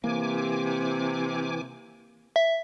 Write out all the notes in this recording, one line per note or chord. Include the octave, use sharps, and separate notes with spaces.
C3 E3 A#3 G#5 D6
E5